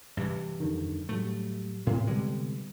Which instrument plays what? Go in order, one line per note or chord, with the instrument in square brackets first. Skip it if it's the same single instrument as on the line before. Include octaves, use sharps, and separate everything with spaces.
[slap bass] G2 C3 E3
[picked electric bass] F2 D3 D#3
[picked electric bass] A2 F#3 G3 [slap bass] A3
[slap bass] A2 [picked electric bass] C3 B3
[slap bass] D3 G3 G#3